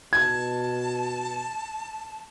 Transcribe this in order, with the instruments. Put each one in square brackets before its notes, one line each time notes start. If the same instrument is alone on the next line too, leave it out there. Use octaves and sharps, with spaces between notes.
[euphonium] B2 [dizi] A5 [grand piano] G#6